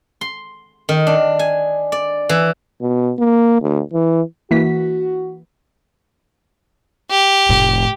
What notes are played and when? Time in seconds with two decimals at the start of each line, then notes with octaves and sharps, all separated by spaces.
0.21 C6
0.89 D#3
1.07 D4
1.39 G#5
1.92 D5
2.29 E3
2.81 B2
3.19 A#3
3.62 D2
3.93 E3
4.51 E3 A#3 F#4 B6
7.11 G4
7.49 F1 A2